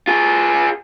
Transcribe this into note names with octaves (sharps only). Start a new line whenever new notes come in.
F4 G#4